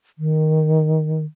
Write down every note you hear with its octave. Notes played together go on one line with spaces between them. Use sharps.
D#3